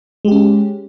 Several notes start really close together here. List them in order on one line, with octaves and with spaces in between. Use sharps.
G#3 G4 C#4